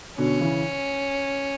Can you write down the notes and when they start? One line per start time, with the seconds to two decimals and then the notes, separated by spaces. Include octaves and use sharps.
0.18 B2 D3 C#4
0.40 C#3 E3